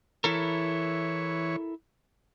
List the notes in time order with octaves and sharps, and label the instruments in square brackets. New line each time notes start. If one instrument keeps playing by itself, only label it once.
[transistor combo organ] E3 C#5 [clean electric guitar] E4 A4 A#4